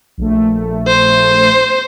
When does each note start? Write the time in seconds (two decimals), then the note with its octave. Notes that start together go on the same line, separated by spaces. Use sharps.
0.18 A#1 A3
0.87 C5